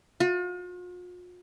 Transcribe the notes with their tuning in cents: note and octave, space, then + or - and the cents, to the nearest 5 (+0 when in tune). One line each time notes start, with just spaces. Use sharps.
F4 +45